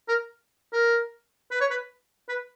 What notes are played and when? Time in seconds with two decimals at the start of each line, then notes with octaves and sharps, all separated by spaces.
0.08 A#4
0.73 A#4
1.51 B4
1.61 C#5
1.70 B4
2.29 B4